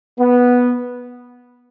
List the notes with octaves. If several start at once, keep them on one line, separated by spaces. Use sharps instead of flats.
B3